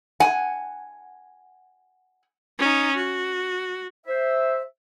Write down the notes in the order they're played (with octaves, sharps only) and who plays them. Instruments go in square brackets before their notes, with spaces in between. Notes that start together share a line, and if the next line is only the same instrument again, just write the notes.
[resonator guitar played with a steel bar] F#5 G#5
[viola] C#4 D#4
F#4
[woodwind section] C5 E5